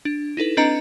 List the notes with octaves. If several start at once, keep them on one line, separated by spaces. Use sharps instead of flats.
D4
D#4 E4 A4 B4
C4 D4 B4 D#5 A#5 C#7